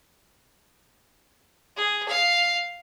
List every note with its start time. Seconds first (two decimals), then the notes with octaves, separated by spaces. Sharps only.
1.76 G#4
2.08 F5